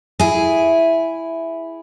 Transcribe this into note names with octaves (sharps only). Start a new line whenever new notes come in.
E4 G#4